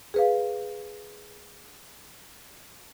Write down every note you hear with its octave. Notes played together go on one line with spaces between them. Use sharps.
G#4 B4 F5